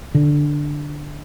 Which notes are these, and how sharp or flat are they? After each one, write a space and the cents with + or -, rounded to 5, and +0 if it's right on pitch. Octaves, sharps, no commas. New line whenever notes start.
D3 +0